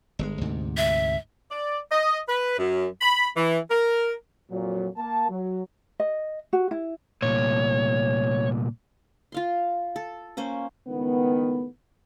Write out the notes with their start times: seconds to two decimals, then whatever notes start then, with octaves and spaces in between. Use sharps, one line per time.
0.19 G1 C3 G#3
0.41 D2 G#2 C3
0.77 E5
1.52 D5
1.92 D#5
2.29 B4
2.59 F#2
3.01 B5
3.37 E3
3.71 A#4
4.51 F2 A#2 F#3
4.97 A#3 A5
5.29 F#3
6.00 D#5
6.53 F#4
6.71 E4
7.22 C2 A#2 C#5
9.32 F4 F5 C6
9.96 A4
10.37 A#3 C#4 C5
10.88 C#2 A2 D#3 B3